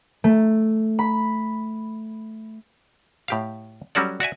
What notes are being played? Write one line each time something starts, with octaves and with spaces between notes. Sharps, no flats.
A3
B5
A2 G4 F5
F#3 G3 C#4 F#4 A4 D5
F#4 D5 E5 G#5